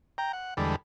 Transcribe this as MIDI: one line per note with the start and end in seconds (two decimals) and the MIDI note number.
0.18 0.32 79
0.18 0.32 82
0.33 0.54 78
0.57 0.76 40
0.57 0.76 50
0.57 0.76 55
0.57 0.76 56
0.57 0.76 69
0.57 0.76 83